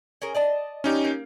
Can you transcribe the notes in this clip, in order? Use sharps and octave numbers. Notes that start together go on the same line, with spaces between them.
C#4 G#4 A#4
D5 D#5 A5
C#4 D#4 G4
A#3